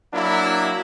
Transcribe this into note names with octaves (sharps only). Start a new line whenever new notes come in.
F#3 A#3 D4 E4